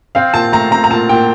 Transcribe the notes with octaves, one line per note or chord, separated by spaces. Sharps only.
C4 F5
A#2 A5
A3 A#5
C4 A#5
A#5
A#2 A5
A#2 G5